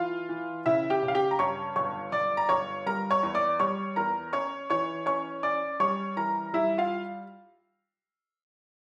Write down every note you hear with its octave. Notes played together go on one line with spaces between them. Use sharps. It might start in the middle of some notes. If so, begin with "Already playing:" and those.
Already playing: E3 F4 F5
E3
C#3 E4 E5
G4 G5
C#3
F5
G4 G5
A#5
G2 C#5 C#6
G1 C#5 C#6
G1 D5 D6
A#5
G1 C#5 C#6
G3 A#4 A#5
C#5 C#6
E2
D5 D6
G3 C#5 C#6
E2 A#4 A#5
C#4 C#5 C#6
E3 C#5 C#6
C#4 C#5 C#6
C#4 D5 D6
G3 C#5 C#6
E3 A#4 A#5
G3 E4 E5
F4 F5